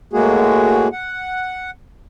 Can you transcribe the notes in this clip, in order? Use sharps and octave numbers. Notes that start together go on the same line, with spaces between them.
A2 G#3 A#3 F#4 G#4
F#5